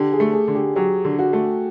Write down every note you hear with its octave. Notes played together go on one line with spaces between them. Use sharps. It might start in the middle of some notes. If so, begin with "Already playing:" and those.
Already playing: D3 G4
G#4
A3
G#4
D3
G4
F#3 G4
D3
F#4
A3